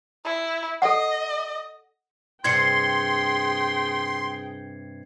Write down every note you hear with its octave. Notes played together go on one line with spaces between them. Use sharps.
E4
A4 D#5 F#5
G2 C3 G#4 G5 C6 G#6 C7 C#7